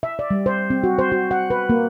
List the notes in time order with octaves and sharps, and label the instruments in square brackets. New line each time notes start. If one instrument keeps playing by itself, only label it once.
[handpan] E5
D5
G3
C5
C4
F#4
C5
F#4
F#5
B4
A#3